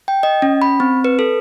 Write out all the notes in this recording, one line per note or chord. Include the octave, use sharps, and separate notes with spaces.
G5
D#5
C#4
B5
C4
B4
A4